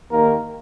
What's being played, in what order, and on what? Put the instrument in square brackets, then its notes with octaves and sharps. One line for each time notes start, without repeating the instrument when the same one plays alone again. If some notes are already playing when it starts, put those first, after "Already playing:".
[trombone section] D#2 D#3 A#3 A#4